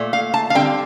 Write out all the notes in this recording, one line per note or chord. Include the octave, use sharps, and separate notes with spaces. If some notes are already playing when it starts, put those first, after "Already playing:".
Already playing: A#2 A3
F5
A5
F5
D3 G3 C4 G5